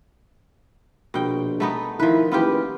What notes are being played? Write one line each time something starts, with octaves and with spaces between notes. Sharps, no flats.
A#1 B2 G5
A3 B3 D#4
D#3 F3 E4 B4
F#1 E3 B3 F4 G4